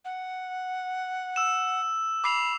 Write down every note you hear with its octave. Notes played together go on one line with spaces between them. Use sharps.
F#5
E6 E7
B5 D6 C7 F7